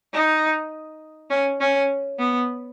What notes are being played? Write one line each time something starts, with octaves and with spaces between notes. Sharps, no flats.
D#4
C#4
C#4
B3